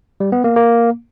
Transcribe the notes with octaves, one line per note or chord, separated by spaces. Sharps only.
G3
B3
A#3
A#3